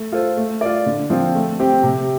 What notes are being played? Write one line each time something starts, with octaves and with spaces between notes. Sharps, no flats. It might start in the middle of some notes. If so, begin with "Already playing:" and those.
Already playing: A3
F4 A4 C5
A3
F4 D5
D3
F3 C4 F4
A3
C4 G4
C3